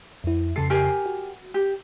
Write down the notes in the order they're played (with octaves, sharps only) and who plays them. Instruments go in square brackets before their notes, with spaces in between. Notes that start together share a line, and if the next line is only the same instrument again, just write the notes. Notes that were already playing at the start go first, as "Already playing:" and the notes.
[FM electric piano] F2 E4
[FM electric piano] F2 C#3 C7 [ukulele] A4
[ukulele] G4 A#4 G#5
[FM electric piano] F#4
[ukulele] G4